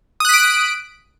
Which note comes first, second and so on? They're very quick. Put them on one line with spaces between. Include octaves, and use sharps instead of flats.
D#6 F#6 B6 D7